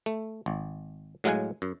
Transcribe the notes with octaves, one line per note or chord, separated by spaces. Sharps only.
A3
G#1
A2 F#3 G#3 F5 F#5 G#5
F#2